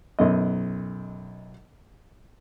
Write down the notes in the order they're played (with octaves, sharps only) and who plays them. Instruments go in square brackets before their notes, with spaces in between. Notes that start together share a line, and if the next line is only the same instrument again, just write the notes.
[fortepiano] B1 F#2 D#5